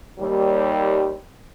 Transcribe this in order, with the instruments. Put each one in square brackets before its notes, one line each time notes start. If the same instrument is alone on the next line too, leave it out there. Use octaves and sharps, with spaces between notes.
[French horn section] D#2 G3